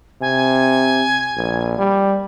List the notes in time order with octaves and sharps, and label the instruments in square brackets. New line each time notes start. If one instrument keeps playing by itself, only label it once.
[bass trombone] C3 [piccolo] G#5
[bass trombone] A#1
G3